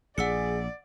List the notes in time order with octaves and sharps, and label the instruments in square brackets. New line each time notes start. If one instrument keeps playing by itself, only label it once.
[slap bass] A#1 [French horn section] G#4 [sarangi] D5 [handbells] F#5 E6 C#7